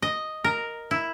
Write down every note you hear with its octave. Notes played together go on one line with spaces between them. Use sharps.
D#5
A#4
E4